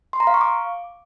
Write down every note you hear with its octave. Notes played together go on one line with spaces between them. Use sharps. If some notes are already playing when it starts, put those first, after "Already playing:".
C6
A#5
F5
C#6
D6